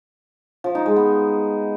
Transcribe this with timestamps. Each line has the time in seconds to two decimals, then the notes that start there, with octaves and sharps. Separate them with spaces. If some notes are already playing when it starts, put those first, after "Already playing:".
0.64 F3
0.75 D#4
0.86 G#3
0.96 B3